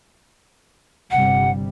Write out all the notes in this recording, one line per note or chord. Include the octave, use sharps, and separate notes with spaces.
G1 C3 G3 F#5